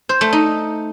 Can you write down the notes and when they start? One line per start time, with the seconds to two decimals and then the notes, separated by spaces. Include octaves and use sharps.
0.09 C5
0.21 A3
0.33 D#4